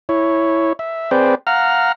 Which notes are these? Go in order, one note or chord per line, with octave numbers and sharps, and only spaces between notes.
E4 C#5
E5
C4 G#4 B4 C5 D5 G5
F5 F#5 A#5 F6